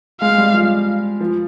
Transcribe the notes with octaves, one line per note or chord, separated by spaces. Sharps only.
G#3 F5
G3
F3
F3